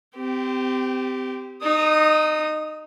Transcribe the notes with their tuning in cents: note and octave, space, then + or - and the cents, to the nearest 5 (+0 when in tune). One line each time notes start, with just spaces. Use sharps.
C4 -30 G4 +0
D#4 -20 D#6 +10